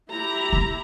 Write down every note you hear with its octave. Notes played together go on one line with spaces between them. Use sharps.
E4 G4 A#5
A#3